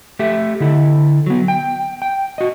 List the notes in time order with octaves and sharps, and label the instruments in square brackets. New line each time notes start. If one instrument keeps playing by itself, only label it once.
[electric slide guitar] A3 G4 E5
D3 E4 A4
F#3 B3
G5
G5
F#4 D#5